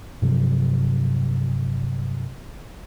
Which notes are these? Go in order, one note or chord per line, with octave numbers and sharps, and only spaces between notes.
G2 C3 F3 F#3